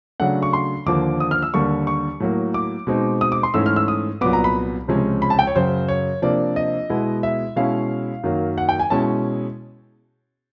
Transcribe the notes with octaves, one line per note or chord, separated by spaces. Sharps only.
C#3 F#3 A3 D4 F#5
C#6
C6
D#2 D3 F3 A#3 D6
D#6
F6
E6
D#2 D3 G3 A#3 C#6
C#6
A2 F#3 A#3
D6
B2 G#3 C4 D#4
D#6
D6
C6
G#2 E3 A3 C#4 E6
F6
E6
D#6
C2 A#2 F#3 B3 D6
A#5
B5
C#2 C3 F3 G#3 C#4
B5
A5
G5
C#5
F#2 C#3 F#3 C5
C#5
C3 F3 A#3 D4 D5
D#5
B2 G#3 B3 E4
E5
B2 G#3 C#4 E4 F5
F#2 D#3 F#3 A#3
F#5
G5
G#5
B2 G#3 C#4 E4 A5